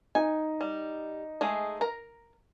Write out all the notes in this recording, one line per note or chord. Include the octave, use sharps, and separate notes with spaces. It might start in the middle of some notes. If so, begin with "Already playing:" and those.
D#4 G#5
G3
G#3 A3 G#4
A#4 A#5